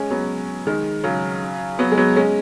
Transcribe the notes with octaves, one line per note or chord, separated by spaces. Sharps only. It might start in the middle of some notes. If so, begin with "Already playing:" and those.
Already playing: G#3 C#4
F#3 B3
D#3 G#3
C#3 F#3
F#3 B3
G#3
F#3 B3
G#3 C#4